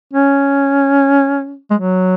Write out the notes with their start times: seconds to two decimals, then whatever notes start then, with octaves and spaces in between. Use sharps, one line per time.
0.13 C#4
1.70 G#3
1.74 F#3